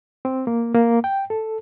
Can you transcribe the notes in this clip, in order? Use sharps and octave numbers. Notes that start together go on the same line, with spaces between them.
C4
A#3
A#3
G5
A4